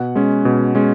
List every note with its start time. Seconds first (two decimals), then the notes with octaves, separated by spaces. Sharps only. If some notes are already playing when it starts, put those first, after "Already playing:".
Already playing: B2 F#5
0.15 G#3 C#4
0.45 B2
0.75 G#3 C#4